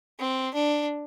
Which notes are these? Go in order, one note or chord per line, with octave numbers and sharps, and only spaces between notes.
C4
D4